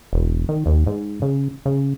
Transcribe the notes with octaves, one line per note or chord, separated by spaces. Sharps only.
E1
D#3
D#2
G#2
C#3
C#3